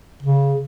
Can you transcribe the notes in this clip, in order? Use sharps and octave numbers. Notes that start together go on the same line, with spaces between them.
C#3